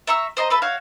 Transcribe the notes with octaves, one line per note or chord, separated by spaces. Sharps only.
E5 A#5 C#6 E6
C5 D#5 A5 A#5
A4 B4 E5
F#4 C#5 F5